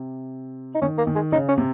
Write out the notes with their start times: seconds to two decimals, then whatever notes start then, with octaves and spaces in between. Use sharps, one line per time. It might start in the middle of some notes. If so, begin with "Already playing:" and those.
Already playing: C3
0.75 D#4
0.81 D#3 C#4
0.98 A#3
1.07 D#3
1.15 G#3
1.32 C#3 D#4
1.49 C#4
1.58 C3